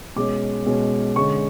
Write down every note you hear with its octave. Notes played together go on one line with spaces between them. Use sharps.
B2 G#3 C#4 D6
B2 G#3 C#4
D3 G#3 C#4 C#6